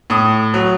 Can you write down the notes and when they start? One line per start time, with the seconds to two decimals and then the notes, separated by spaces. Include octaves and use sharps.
0.10 A2 D#6
0.54 F#3